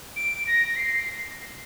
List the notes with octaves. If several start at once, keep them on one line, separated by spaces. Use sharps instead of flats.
D7
A#6
C7